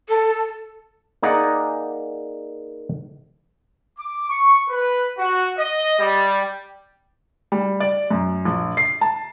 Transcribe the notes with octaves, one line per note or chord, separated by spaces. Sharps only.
A4
A#3 D#4 G#4 D5 D#5 F#5
D6
C#6
B4
F#4
D#5
G3
G3
D5
F#2
A#1
C7
A5